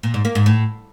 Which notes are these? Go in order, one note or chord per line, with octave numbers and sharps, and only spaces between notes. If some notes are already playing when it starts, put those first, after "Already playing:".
A#2
G#2
A#3
G#2
A2